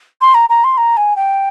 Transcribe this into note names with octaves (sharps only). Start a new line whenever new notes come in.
C6
A#5
A#5
C6
A#5
G#5
G5